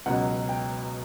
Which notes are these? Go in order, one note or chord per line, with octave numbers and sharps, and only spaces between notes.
C#2 B2 F#3 F#5
G5